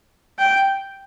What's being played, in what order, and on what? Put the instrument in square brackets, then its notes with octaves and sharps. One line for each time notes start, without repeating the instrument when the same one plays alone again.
[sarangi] G5